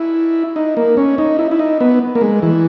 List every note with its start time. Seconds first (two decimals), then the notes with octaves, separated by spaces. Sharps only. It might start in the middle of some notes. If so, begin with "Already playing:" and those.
Already playing: E4
0.56 D#4
0.77 A#3
0.97 C#4
1.18 D#4
1.39 E4
1.51 E4
1.59 D#4
1.81 B3
2.15 A#3
2.21 G#3
2.42 E3